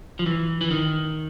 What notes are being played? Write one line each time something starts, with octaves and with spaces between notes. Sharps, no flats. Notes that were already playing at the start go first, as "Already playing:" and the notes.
F3
E3
E3
D#3